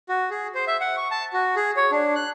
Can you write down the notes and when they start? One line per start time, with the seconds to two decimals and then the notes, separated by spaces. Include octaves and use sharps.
0.09 F#4
0.30 G#4
0.55 C5
0.67 E5
0.81 F#5
0.97 C#6
1.11 A5
1.33 F#4
1.56 G#4
1.76 C#5
1.91 D4
2.15 F#6